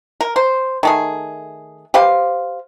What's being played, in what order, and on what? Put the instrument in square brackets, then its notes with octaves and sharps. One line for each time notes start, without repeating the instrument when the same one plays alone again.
[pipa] A#4
C5
D#3 A3 G#4
G4 B4 C5 F5